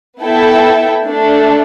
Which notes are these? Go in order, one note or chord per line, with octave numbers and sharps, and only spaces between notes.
B3 E4 A4 E5 G5
A3 D4 A4